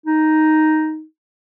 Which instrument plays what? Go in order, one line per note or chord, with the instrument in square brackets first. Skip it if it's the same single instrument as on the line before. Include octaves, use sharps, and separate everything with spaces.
[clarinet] D#4